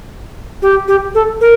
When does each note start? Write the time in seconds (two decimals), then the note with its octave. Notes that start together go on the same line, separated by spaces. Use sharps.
0.62 G4
0.88 G4
1.15 A4
1.41 A#4